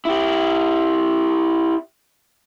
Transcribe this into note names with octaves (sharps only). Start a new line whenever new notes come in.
E4 G4